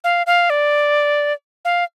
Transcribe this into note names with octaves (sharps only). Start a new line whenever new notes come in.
F5
F5
D5
F5